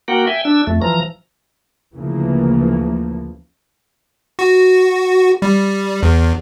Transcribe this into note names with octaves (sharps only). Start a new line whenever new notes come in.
A#3 F#4 A#4 F#5 G5
E5 G5 G#5
D4 E6
F2 A3
E3 F3 A#5
D2 C#3 E3 F3 A#3
F#4
G3
E2